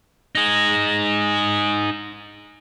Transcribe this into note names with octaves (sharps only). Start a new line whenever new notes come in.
D#4 G#4